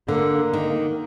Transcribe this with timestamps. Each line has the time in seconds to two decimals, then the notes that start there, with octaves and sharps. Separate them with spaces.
0.08 D3 A#3
0.53 D#3